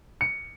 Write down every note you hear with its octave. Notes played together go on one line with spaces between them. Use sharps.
C#7